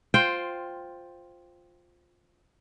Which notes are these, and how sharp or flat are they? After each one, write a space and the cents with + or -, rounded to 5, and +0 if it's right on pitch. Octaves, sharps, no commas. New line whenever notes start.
F4 +10 C5 +0 G5 +0